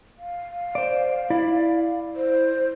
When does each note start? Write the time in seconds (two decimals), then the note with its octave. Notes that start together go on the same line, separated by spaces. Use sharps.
0.19 F5
0.75 C5 D5
1.30 E4 D5
2.16 C5